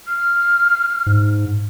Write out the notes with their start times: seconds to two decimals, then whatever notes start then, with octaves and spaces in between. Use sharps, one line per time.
0.07 F6
1.06 G#2